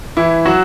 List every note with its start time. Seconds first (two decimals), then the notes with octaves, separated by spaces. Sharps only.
0.17 E3 E4
0.45 F#3 F#4